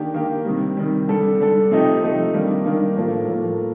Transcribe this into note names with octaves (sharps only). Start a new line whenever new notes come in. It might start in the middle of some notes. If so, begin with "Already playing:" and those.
Already playing: D#3 A#3 D4 G4
D#3 A#3 D4 G4
C3 D#3 G3
C3 D#3 G3
D3 G3 D4 A4
D3 G3 D4 A4
C3 F3 A3 D#4 G4
C3 F3 A3 D#4 G4
D#3 G3 A#3 D4
D#3 G3 A#3 D4
A2 F3 A#3
A2 F3 A#3